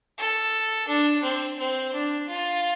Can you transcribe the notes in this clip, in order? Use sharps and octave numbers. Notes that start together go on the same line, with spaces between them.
A4
D4
C4
C4
D4
F4